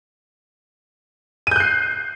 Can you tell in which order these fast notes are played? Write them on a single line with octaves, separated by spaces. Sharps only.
D#7 G6 F#6 C7